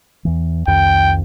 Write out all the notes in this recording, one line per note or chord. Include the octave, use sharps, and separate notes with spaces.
E2 E3
C2 F2 D#3 G5